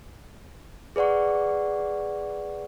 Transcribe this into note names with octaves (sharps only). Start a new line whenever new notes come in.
G#4 B4 D5 F#5 C#6